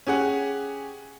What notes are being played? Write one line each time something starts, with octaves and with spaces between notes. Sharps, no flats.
C#4 G4 G#4 F#5